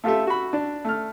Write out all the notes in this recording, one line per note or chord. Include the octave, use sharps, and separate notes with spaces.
A3 F4 G4 A4 E5
F#4 B5
D4
A3 F6